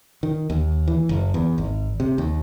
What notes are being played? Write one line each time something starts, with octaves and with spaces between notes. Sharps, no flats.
D#3
D#2
E3
F#1
E2
G#1
C3
D#2